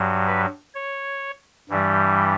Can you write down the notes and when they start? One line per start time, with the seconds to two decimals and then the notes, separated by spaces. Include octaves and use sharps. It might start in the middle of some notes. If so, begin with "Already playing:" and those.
Already playing: G2 F#3
0.27 B4
0.75 C#5
1.70 G2 E3 G3